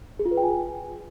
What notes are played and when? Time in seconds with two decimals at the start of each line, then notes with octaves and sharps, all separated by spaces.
0.19 G#4
0.25 F4
0.31 B4
0.37 G5
0.43 G#5